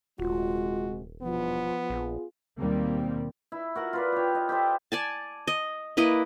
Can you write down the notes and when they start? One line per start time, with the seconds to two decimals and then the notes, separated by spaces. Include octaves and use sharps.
0.19 D#1 C3 G#3 F4 F#4
1.22 E2 G2 B2 F3 B3
1.90 A#1 F4 G#4
2.59 D#2 B2 G3 A#3 C4
3.52 E4
3.76 F#4 A#4 F#5
3.93 F4 B4 D5
4.12 G4 C#5
4.35 D#5
4.49 G4 A4 C5
4.92 D5 G#5 A5
5.47 D#5
5.97 A#3 E4 B4 D#5